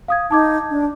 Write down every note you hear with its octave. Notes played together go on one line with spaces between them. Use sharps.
F5 D#6 G#6
D#4 A5 D6 G#6
D4